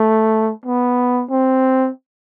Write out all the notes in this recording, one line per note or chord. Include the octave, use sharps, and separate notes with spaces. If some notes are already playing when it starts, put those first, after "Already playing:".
Already playing: A3
B3
C4